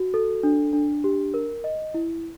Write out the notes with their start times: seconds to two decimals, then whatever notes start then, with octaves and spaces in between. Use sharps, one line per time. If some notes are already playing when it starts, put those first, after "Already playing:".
Already playing: F#4
0.14 A4
0.43 D4
0.73 D4
1.04 G4
1.34 A#4
1.64 D#5
1.94 E4